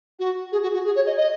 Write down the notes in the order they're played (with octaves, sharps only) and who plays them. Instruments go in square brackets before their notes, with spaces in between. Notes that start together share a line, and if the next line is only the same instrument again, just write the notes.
[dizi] F#4
G#4
F#4
F#4
G#4
C#5
D#5
D#5